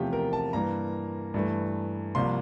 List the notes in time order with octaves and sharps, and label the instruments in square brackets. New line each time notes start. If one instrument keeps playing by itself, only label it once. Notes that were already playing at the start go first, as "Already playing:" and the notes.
Already playing: [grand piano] E2 C3 F3 A3 F4 G4
A#4
A5
G2 E3 A#3 A#5
G2 E3 A3
C2 C3 F3 A#3 C6